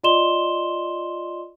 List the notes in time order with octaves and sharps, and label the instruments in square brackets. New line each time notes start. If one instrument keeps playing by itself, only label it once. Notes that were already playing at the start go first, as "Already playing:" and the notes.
[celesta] F4 D5 D#5 C6 E7 G7